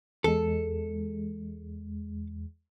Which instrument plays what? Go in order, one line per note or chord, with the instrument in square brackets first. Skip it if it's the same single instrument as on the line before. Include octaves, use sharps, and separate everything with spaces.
[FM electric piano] E2 G#3 [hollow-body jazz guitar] A4